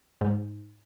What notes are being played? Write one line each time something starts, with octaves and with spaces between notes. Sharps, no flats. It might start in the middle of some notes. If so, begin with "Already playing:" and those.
G#2